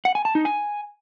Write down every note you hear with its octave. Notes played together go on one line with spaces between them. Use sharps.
F#5
G#5
A5
D#4
G#5